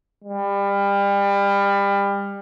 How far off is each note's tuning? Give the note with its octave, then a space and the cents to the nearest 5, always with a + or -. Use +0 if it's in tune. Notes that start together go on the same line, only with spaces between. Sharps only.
G3 +30